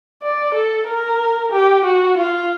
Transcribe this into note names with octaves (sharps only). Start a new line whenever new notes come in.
D5
A4
A#4
G4
F#4
F4